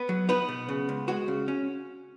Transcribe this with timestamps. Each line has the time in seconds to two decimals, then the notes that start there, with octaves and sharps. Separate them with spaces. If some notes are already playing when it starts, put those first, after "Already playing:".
Already playing: B3 B4
0.09 F#3
0.29 B3 D#4 B4
0.48 B2
0.69 C#3
0.89 C#2
1.08 G#3 F#4
1.28 C#3
1.48 C#4